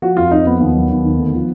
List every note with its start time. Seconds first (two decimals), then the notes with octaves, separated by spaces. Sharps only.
0.02 F3 F#4
0.17 F2 F4
0.31 F2 D#4
0.46 F3 B3
0.60 D#2
0.75 F#3
0.90 D#2
1.04 D#3
1.19 D2
1.34 F3